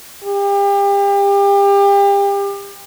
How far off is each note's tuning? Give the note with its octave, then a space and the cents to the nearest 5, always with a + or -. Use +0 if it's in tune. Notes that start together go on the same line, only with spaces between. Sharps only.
G4 +35